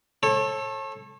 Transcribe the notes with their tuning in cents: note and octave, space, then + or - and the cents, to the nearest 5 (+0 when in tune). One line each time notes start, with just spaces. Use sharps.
A4 +0 C#5 -35